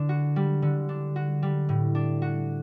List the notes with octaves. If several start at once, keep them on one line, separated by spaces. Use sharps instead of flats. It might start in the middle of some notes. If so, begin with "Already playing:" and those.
Already playing: D3 D4
F#4
G3
D3
D4
F#4
G3
A2
D4
F#4